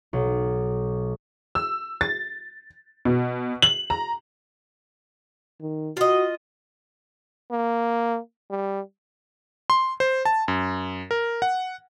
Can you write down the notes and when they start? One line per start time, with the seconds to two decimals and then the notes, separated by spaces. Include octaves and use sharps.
0.13 B1
1.55 E6
2.01 A6
3.05 B2
3.62 F#7
3.90 A#5
5.61 D#3
5.97 F4 F#4 D#5
7.51 A#3
8.51 G3
9.70 C6
10.00 C5
10.25 A5
10.48 F#2
11.11 A#4
11.42 F#5